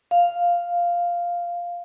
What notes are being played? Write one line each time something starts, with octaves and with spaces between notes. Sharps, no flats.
F5